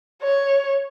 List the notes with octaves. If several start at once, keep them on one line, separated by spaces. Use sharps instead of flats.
C#5